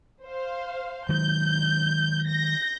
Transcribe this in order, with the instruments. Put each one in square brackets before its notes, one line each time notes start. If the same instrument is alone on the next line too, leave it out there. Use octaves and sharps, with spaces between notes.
[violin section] C5 F5
[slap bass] D#3 F#3 G#3 [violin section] G6
[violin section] G6 A#6